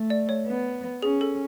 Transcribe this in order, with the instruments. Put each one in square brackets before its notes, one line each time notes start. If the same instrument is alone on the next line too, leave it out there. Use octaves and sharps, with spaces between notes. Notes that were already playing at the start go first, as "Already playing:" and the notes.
Already playing: [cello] A3
[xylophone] D5
C#5
[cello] B3
[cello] C#4 [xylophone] G#4
[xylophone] A4